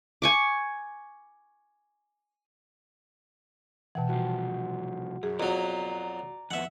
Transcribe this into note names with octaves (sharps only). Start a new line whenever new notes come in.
G#5 C#6 D6
B2 E3 F#5 G5 A5
C2 F3 F#4 F#5
F#2 G#4
F2 F#3 D5 A#5
F2 B3 E5 F#5